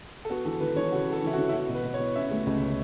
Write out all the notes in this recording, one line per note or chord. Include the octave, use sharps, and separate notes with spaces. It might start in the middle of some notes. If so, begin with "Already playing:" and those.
A4
B3 F#4
E3 A4
E3 B4
E3 C#5
C#3 F#4
C#3
A4
E3 E4
F#4
E3
E4
B3 F#4
B2
B4
B2
C#5
B3
C#4 E5
A3
C#2